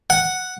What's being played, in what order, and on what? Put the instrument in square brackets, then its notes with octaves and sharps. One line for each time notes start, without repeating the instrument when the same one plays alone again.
[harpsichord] F#5